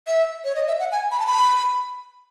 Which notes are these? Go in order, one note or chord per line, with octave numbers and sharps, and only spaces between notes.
E5
C#5
D#5
E5
F#5
G#5
B5
A5
B5